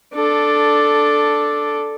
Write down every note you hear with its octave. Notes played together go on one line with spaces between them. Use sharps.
D4 A4